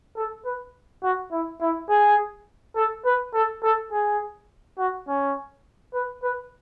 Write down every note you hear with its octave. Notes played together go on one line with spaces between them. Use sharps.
A4
B4
F#4
E4
E4
G#4
A4
B4
A4
A4
G#4
F#4
C#4
B4
B4